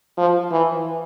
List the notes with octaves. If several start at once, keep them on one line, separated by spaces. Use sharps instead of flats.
F3
E3